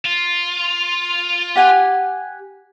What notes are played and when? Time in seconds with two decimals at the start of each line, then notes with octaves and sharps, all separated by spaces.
0.05 F4
1.56 G4 F#5 G#5